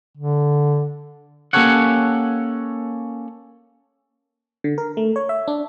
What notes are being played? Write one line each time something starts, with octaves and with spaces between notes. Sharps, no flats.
D3
A#3 C#4 G4 A4 C#5 F#5
D3
A#4
A3
C#5
E5
D4